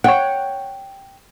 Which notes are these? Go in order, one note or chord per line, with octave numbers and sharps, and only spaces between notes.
C#5 F#5 G5